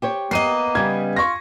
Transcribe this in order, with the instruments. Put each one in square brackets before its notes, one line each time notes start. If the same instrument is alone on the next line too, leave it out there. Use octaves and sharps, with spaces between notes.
[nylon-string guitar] G4 C5 C#5
[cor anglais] A#3 [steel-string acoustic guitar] B3 D#5 [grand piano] C7 D#7
[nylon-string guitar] C#3 G3 [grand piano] G#6
[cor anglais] F4 [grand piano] C#6 A#6